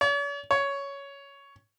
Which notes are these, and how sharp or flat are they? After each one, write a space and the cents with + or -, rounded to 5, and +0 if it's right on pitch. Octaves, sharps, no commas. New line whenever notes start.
C#5 +45
C#5 +10